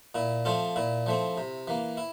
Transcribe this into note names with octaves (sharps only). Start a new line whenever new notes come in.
A#2 E4
F3 A3 C4 F4
A#2 E4
F3 A3 C4
C3
E3 A#3
E4